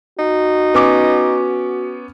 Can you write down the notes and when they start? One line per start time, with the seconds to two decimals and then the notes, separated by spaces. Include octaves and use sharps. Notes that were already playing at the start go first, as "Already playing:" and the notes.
0.19 D#4 F#4
0.74 B3 C#4 D6